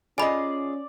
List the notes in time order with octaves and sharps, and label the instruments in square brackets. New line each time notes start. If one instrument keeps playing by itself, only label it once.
[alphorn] C#4 [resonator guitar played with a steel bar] F4 G#4 D#5 [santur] D5 [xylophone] G#5 B5